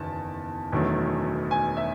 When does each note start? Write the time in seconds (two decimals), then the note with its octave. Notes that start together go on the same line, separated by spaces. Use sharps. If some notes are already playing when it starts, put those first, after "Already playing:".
Already playing: F#1 E2 D#3 A5
0.72 E1 E2 D#3 F#3 A3
1.51 G#5
1.77 E5